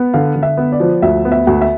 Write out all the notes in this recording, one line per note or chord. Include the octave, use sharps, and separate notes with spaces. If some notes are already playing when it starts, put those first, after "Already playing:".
Already playing: B3
D3 F5
D3
E5
B3
D5
F3
D2 E5
B3
E5
D2
E5